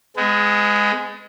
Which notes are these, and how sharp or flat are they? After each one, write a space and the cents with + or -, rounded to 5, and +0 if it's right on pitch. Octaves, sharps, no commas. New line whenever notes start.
G#3 +0 B3 +40